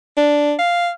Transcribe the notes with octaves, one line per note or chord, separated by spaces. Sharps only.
D4
F5